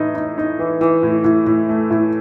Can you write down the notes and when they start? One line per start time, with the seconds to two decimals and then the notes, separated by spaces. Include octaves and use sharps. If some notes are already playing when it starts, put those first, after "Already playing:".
Already playing: A2 E3 D#4
0.15 D#4
0.38 D#4
0.59 E3
0.81 E3
1.03 A2
1.24 A2
1.46 A2
1.69 A3
1.90 A2